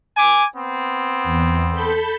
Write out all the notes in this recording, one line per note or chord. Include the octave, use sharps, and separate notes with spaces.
G#5 D6
B3 C4
E2
A4 B5 G6